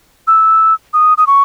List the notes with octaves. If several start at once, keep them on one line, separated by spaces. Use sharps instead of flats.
E6
D#6
D#6
C#6